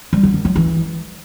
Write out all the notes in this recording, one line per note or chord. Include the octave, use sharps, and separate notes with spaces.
G3
B3
D#3
F#3
E3